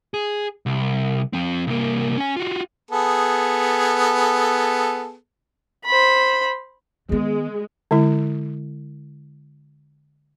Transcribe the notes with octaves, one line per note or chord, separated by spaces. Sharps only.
G#4
C2
F3 C4
C2 A#3
C#4 G#5
F4 F#4
B3 G#4 A4
C5 B5
D#3 G#3 B3
D3 G#3 E4